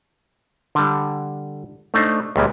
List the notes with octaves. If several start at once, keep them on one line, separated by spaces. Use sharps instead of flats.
D3 G3
A3 D4 D#4 C5
C#2 A#2 G3 G#3